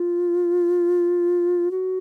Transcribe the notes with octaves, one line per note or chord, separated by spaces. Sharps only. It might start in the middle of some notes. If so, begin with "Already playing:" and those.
Already playing: F4
F#4